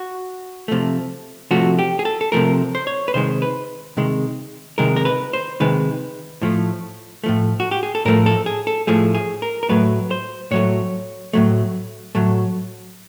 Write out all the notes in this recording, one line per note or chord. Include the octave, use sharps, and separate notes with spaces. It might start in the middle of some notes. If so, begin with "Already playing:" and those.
Already playing: F#4
C3 F3 A3
C3 F3 A3 F#4
G4
G#4
A4
A4
C3 F3 A3 A#4
C5
C#5
B4
C3 D#3 G#3 C5
B4
C3 D#3 G#3
C3 D#3 G#3 A#4
A#4
B4
C5
C3 D#3 G#3 B4
A2 F3 A3
A2 F3 A3
F#4
G4
G#4
A4
A2 F3 A3 A#4
A4
G#4
A4
A2 F3 A3 G#4
G#4
A#4
A#4
A2 F#3 A3 B4
C5
A2 F#3 A3 C#5
A2 F#3 A3
A2 F#3 A3